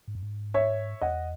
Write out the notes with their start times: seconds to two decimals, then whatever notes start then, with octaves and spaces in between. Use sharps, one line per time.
0.08 G#2
0.15 F#2
0.23 G#2
0.54 C#5 E5
1.01 E2 D#5 F#5